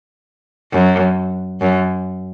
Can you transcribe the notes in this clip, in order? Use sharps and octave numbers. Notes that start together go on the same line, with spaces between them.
F#2
F#2